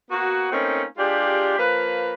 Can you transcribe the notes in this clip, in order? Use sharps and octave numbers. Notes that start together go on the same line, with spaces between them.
A#3 B3 F#4
A3 A#3 C4 C#4 D#4
G#3 D4 F4 G4
F3 A#3 B4